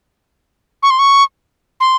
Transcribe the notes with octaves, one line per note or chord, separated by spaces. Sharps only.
C#6
C6
C#6
C6